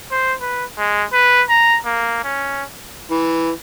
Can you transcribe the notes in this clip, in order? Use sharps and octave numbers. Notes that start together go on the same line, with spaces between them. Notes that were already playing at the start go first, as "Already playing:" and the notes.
C5
B4
G#3
B4
A#5
A#3
C#4
E3